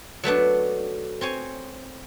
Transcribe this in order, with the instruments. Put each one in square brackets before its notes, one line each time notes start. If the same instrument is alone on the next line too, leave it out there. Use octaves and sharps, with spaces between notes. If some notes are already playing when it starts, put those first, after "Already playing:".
[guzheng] F#3 A3 B3 D4
C4 C#5 G#5